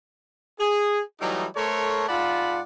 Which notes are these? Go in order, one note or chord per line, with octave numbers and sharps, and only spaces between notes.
G#4
E3 F#3 G3 A3 D#4
A3 A4 A#4 C5 C#5
G#2 F4 D5 F#5 A5 B5